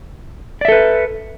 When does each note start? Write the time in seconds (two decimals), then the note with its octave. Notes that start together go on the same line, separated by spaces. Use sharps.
0.61 D5
0.65 E5
0.68 A4
0.72 B4